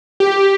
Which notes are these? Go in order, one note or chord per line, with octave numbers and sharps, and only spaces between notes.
G4